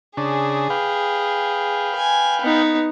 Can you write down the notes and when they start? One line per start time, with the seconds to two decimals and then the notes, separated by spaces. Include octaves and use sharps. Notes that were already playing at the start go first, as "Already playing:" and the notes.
0.17 C#3 D4 G#4
0.70 B4 F5 G5
1.96 G#5
2.42 B3 D#4